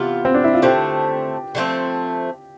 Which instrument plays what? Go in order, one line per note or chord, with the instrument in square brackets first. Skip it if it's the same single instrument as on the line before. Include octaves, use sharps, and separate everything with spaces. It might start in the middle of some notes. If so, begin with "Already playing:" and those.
Already playing: [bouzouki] C3 E3 B3 F4
[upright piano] C4
D4
E4
F4
[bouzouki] D3 A3 C4 [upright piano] G4
[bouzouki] D3 F3 A3 C4